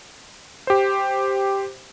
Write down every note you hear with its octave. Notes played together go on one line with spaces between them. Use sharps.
G4 C5